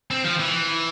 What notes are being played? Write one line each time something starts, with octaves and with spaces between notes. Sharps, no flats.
C4
F3
E3